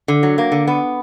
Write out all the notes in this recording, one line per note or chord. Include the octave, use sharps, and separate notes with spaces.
D3
F#3
A#3
D3
B3